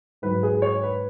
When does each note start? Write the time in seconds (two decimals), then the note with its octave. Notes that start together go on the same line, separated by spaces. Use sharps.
0.22 G#2 F#3 B4
0.43 G#4
0.62 C#5
0.83 B4